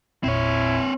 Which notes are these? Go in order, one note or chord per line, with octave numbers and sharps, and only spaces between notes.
G#1 E2 A#2 C4 E4 C#5